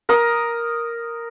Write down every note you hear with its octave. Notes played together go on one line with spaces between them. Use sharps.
A#4 D#6